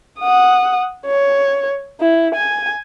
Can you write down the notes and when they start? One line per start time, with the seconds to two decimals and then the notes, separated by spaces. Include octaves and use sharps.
0.20 F#5 D#6
1.06 C#5
2.00 E4
2.34 G#5